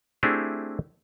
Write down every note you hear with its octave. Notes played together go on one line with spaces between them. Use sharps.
A3 C4 D4 E4 G4 G#4